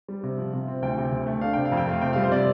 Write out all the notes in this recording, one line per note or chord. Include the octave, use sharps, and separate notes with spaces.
G3
C3
F3
C3
C4
D2 G5
C3
D2
A3
D4 F5
C3 G5
F5
F2
G5
A3 F5
C3 G5
G3 F5
C5
C3 D5